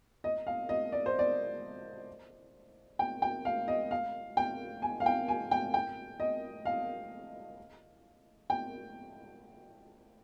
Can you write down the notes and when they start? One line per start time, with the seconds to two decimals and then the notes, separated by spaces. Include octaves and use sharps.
0.24 D#5
0.47 F5
0.69 D#5
0.92 D5
1.06 C5
1.19 D5
2.99 G5
3.22 G5
3.45 F5
3.68 D#5
3.91 F5
4.37 G5
4.82 G#5
5.00 F5
5.06 G5
5.28 G#5
5.51 G5
5.74 G5
6.20 D#5
6.65 F5
8.50 G5